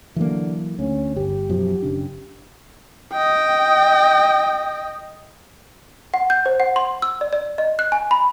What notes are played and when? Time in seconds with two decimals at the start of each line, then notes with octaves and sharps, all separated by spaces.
0.16 D3 E3 F#3 A#3
0.79 D2 C#4
1.16 G1 G4
1.49 F#2 B2 F3
1.82 F#1 C#3 D4
3.13 D#5 G5
6.14 F#5
6.30 G6
6.46 C5
6.60 F#5
6.76 C6
7.02 E6
7.21 D5
7.33 D5
7.58 D#5
7.79 F#6
7.92 G#5
8.11 B5